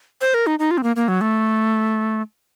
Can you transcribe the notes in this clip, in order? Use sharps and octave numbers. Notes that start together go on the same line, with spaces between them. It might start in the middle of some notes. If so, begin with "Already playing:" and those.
C5
A#4
D#4
D#4
F4
C4
A#3
A#3
F#3
A3